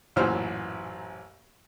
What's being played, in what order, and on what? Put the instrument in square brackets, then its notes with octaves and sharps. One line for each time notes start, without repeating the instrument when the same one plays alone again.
[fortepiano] A1 F#2 A#2 E3 C5 F6